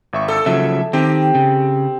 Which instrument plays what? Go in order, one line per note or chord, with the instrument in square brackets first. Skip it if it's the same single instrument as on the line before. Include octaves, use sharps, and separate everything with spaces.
[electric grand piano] G#1 E5 C#6
[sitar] A4
[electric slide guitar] C#3 F3 F#3 [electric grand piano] E5
[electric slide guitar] D#3 [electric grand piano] C4 [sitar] G4
[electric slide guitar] C#3